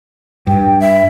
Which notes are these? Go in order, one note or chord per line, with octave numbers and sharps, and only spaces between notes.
G2 G5
E5